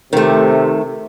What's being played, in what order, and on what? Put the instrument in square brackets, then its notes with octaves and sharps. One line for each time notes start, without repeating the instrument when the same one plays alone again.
[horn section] C3 [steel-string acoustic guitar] D#3 A3